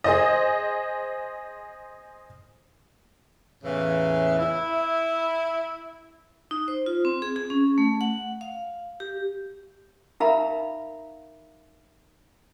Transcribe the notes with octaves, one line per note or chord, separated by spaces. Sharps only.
G#4 C5 D#5
E2 A2 C#3 E3
E4
D#4
C5
F4
C4
G#4
G#4
C#4
A3
F#5
F5
G4
D#4 A#4 E5 F5 A#5 B5